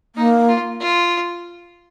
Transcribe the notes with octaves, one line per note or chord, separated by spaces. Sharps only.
A#3 D#4
F4
F4